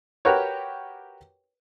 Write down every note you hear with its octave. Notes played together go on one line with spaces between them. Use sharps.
F#4 G4 A#4 B4 C#5